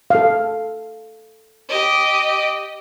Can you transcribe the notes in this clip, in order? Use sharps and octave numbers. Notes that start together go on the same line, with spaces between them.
A4 F5
G4 D#5